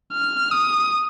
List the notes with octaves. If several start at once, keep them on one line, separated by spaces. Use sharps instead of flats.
F6
D#6